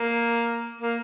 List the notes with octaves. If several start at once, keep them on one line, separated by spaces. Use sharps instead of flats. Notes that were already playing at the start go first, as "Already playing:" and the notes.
Already playing: A#3
A#3